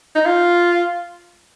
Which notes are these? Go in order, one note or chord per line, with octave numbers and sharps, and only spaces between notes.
D#4
F4